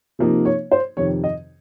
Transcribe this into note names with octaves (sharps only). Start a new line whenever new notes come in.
C3 F3 A#3 D#4
C#5
C5
F2 C3 D#3 C#5
D#5